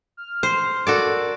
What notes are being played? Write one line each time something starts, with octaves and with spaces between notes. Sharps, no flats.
F6
C5
F#4 A4 A#4 D5